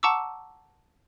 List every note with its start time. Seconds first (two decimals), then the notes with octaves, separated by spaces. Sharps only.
0.03 F#5 A5 A#5 C#6 D6 E6